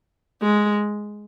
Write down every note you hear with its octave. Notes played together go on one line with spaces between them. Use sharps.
G#3